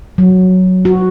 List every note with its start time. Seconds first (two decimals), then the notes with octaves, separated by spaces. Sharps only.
0.18 F#3
0.85 F#4